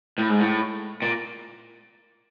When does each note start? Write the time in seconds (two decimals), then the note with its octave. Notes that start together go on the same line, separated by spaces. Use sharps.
0.18 A2
0.29 G#2
0.41 A2
1.02 A#2